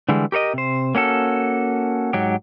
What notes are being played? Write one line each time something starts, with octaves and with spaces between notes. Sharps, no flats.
D3 E3 G3 G#3
G4 A#4 C#5 D#5
C3 C5
A#3 C#4 F#4 A4
G#2 F#3 G4